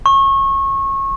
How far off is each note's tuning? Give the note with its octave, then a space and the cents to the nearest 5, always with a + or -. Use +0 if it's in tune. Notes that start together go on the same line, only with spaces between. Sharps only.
C#6 -25